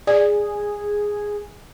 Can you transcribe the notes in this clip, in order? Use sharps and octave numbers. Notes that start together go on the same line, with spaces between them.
G#4 D5